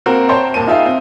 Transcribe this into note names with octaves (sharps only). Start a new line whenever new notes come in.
A#3 C4 F#4 A#4
C5 C#5 G5 A5 A#5 C6
D#1 D#2 A#3 A5 D#7
D#4 F4 G#4 E5 F5 G5
C4